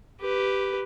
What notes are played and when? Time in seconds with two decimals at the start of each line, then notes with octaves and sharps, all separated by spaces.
0.20 G4 B4